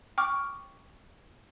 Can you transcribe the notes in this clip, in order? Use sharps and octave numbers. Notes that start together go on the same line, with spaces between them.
G5 C#6 D6 F6